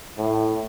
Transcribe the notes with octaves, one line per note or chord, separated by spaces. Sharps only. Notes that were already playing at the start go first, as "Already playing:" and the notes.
A2